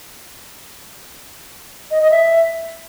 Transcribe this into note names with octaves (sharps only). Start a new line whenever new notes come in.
D#5
D#5
E5